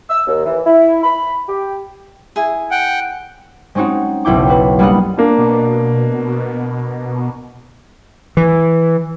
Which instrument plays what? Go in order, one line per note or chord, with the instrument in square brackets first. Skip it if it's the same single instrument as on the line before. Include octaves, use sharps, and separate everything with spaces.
[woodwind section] E6
D#2
E3
E4
B5
G4
[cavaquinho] E4 G#4
[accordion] F#5 G5
[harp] G#3 C4 C#4 D#4 F#4
F#1 B1 E4 G5 D6
E4 F#4 B4
G3 A#3 B3 D4 D#5 F#5
[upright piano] A#3 D4
[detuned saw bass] B2
[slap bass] E3